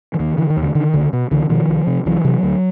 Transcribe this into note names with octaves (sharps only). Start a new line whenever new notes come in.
E3
D#2 D#3
D3 E3
D#3
D#2
D3
D3 D#3
C#2 D3
B2
C#2 D3 E3
B2 D#3 F3
C2
C3
C2 E3 F#3
C3 E3 F#3
D2